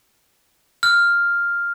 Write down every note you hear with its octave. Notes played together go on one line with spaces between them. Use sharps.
F6